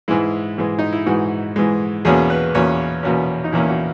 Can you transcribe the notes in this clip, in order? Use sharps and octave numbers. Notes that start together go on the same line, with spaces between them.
G#2 E3 G#3 E4
G#2 E3 G#3
D#4
E4
G#2 E3 G#3 F#4
G#2 E3 G#3
E2 B2 A#3 C#4 G#4
B4
E2 B2 A#3 C#4 C#5
E2 B2 A#3 C#4
D#4
E2 B2 A#3 C#4 E4
F#4